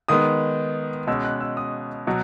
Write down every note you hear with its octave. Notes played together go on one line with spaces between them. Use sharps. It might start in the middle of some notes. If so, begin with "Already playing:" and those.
D#3 G#3 B3 D#6
B2 G#3 C#4 E6
F#6
E6
D#6
B2 F#3